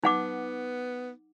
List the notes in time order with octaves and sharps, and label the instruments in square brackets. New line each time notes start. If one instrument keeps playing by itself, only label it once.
[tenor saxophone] B3 [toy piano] D#4 F#5 D6